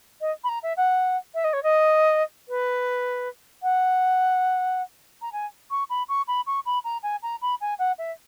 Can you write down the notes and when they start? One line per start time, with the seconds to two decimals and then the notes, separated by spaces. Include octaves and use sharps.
0.20 D#5
0.43 B5
0.48 A#5
0.63 E5
0.77 F#5
1.34 E5
1.44 D#5
1.53 C#5
1.63 D#5
2.48 B4
3.62 F#5
5.21 A#5
5.32 G#5
5.70 C#6
5.89 B5
6.08 C#6
6.27 B5
6.46 C#6
6.65 B5
6.84 A#5
7.03 G#5
7.22 A#5
7.41 B5
7.60 G#5
7.78 F#5
7.98 E5